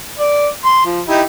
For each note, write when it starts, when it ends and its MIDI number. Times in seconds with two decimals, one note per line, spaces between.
0.19 0.47 74
0.65 0.81 84
0.86 1.00 53
1.08 1.22 63
1.08 1.22 64
1.08 1.22 67